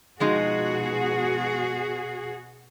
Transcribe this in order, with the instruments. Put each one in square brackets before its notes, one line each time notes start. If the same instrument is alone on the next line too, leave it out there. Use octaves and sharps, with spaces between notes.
[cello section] B2 F#4 G#4 [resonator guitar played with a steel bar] F3 G#3 D#4